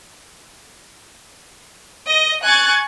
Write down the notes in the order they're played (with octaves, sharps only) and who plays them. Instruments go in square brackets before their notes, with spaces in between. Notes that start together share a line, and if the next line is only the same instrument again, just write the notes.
[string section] D#5
G#5 C#6 F#6 G#6 A6